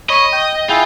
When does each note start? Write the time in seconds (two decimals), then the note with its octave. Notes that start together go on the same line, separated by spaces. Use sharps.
0.10 C#5 D#5 B5
0.33 G5 D#6
0.69 E4 F4 G#4 G5